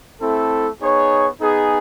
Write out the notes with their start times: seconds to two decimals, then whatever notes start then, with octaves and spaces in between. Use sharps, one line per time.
0.21 A3 C4 E4 A4
0.80 B3 D#4 G#4 C#5
1.40 B3 D#4 G#4